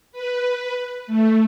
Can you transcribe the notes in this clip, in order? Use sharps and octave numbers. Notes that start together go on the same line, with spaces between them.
B4
A3